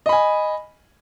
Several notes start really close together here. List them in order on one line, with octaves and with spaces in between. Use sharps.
D#5 B5 G#5